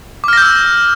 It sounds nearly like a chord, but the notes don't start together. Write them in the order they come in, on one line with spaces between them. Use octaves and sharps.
D6 F6 A#6 G6 E6